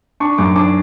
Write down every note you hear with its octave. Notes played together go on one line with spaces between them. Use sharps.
D4 C#6
F#2 D6
D4 D6